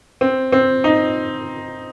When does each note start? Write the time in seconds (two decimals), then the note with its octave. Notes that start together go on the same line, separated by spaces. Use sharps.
0.21 C4
0.52 C4
0.84 D#4